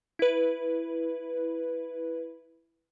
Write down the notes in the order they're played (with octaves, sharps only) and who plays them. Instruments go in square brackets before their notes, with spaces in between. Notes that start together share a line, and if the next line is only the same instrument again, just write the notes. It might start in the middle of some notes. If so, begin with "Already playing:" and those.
[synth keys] E4 B4